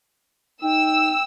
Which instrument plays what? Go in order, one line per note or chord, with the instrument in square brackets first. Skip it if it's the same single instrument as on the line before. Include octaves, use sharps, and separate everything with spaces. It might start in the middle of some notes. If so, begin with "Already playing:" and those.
[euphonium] D#4 [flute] G5 [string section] E6